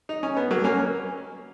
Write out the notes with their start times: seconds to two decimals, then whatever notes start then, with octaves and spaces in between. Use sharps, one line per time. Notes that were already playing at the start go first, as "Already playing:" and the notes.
0.09 D#4
0.23 C#4
0.37 B3
0.51 F#3 A#3
0.64 A#3 C#4